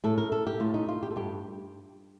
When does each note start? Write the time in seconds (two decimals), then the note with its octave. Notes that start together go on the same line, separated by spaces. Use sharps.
0.04 A2 A4
0.18 A#4
0.32 A4
0.47 G4
0.60 A2 F4
0.74 D#4
0.89 F4
1.03 G4
1.11 A4
1.16 G2 G4